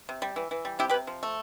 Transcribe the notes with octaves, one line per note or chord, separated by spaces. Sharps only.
C3
G3
E3
E3
G3
C3 E4 G4
G4 B4
C3
F3
A3